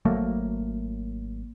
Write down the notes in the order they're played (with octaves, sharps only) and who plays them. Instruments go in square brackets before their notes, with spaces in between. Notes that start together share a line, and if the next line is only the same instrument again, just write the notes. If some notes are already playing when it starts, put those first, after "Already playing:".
[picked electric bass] G#1 F#3 A3 A#3